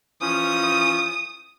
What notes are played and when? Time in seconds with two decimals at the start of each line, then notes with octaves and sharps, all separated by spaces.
0.22 E3 F3 C#4 D#6